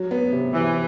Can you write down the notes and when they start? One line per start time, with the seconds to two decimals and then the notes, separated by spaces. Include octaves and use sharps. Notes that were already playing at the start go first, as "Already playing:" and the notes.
Already playing: F#3
0.11 B3
0.32 C3
0.53 C3 E3